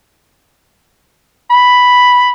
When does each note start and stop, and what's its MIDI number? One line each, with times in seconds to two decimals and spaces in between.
1.50 2.31 83